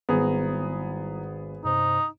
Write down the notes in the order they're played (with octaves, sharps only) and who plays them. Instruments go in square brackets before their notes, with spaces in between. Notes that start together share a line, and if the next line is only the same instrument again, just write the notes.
[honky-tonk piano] G#1 [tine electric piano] G3 E4 A#5 [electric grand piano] B3 G#4
[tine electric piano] G2 C3 C5 [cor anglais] D#4